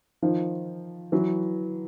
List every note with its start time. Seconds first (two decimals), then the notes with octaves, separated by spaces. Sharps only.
0.22 D#3 F3
1.12 E3 F#3